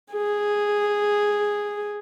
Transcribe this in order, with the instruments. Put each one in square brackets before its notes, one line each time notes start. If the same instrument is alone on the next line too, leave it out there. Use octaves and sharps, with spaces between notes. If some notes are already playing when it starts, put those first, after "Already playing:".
[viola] G#4